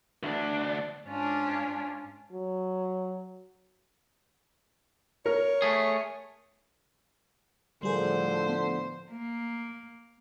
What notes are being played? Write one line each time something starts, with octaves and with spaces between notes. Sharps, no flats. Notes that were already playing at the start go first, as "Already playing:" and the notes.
D2 D4
G#2 C#4 D4 F4
F#3
A#4 C#5
A3 G#4
A2 D3 F3 G3 G#4 A#4 C5
B3
A#3